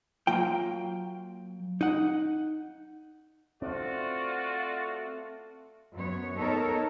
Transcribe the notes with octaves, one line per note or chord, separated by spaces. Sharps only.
F#3 A#3 F4 G5
D#4 F#5
A3 C4 F4 F#4 D5
F#2 B3 C#5
B3 D#4 A4 A#4 C#5